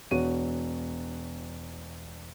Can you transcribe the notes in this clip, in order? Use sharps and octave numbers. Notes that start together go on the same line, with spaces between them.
E1 F#4 C#5 D#7